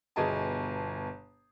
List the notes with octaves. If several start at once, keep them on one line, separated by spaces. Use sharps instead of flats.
G1 B2 G#4 D#5 G#5 A5